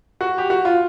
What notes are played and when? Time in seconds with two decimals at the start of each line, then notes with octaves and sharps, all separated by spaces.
0.21 F#4
0.38 G4
0.50 F#4
0.65 F4